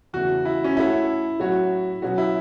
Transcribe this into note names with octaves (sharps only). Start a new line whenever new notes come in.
E2 C#3 A3 F#4
E4
C#4
A2 A3 E4 F#4 A4 C#5
A2 F#3 C#4 F#4 C#5
B2 F#3 C#4 F#4
E4